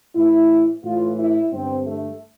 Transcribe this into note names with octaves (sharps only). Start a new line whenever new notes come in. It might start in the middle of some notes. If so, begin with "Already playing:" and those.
A2 E3 E4
A2 E3 F4
E4
G2 D3 C4
A3